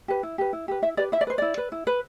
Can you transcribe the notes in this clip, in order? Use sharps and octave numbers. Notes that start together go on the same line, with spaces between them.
G4 B4
E4
G4 B4
E4
G4 B4
E4 E5
G4 B4 D5
E4 E5
D5
B4 C5
E4 D5
B4
E4
B4